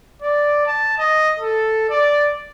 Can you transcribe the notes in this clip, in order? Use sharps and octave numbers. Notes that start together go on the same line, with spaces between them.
D5
A5
D#5
A4
D5